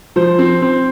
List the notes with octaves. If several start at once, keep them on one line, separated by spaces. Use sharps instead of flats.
F3 C5
C4
C4